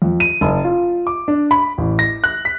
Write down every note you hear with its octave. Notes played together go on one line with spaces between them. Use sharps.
F2
D#7
F#1
F4
D6
D4
B5
A1
A#6
F#6
B6